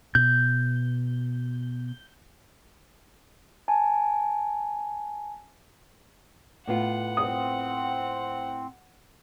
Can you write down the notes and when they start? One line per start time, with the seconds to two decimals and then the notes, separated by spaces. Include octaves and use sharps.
0.15 B2 G6
3.68 G#5 A5
6.67 A2 B3 F4 F#5
7.17 C4 D#6